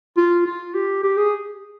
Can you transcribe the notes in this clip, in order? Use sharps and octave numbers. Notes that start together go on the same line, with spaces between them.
F4
F4
G4
G4
G#4